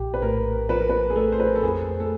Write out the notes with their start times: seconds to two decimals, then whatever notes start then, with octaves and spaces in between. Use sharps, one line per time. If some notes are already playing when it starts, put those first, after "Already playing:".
Already playing: A#1 G4
0.14 B4
0.22 A2 A#4
0.69 F3 B4
0.80 A#4
0.89 B4
1.10 G#4
1.16 A3 A4
1.32 C5
1.40 B4
1.47 A#4
1.55 A4
1.63 F2 G#4
2.00 A4